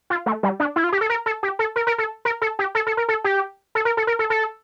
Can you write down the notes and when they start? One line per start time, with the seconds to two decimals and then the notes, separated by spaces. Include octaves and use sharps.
0.10 F4
0.26 A3
0.43 G3
0.60 D4
0.76 E4
0.84 F4
0.92 G4
1.01 A4
1.10 A#4
1.26 A4
1.43 G4
1.59 A4
1.76 A#4
1.87 A#4
1.98 A4
2.25 A#4
2.42 A4
2.59 G4
2.75 A4
2.87 A4
2.97 A#4
3.09 A4
3.24 G4
3.75 A4
3.85 A#4
3.97 A4
4.07 A#4
4.19 A4
4.30 A4